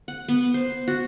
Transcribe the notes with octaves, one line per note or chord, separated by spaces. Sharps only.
F#5
B3
C5
F#4